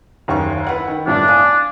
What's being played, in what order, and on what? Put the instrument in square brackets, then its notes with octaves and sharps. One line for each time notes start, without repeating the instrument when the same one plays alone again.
[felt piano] F#1 D#2 C#6
E4 B4 F#5
D#3
[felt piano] G1 C2 A2 [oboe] D4
[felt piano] F5 G#5 D#6